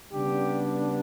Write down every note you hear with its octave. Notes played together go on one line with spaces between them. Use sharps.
C#3 G3 B3 D4 G4